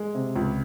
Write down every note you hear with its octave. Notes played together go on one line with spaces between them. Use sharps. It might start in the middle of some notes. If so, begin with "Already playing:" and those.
Already playing: G#3
C3
C#2